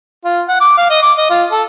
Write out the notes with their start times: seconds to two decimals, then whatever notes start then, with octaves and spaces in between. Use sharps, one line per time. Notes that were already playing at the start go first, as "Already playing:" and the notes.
0.25 F4
0.49 F#5
0.61 D6
0.78 F5
0.91 D#5
1.03 D6
1.18 D#5
1.30 F4
1.52 A4